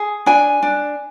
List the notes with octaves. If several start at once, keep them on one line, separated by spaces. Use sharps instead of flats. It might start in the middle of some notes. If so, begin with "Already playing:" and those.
Already playing: G#4
D4 G#5
D4